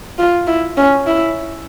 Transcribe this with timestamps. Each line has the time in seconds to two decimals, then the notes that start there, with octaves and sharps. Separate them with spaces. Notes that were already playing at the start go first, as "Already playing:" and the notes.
0.19 F4
0.47 E4
0.77 C#4
1.06 E4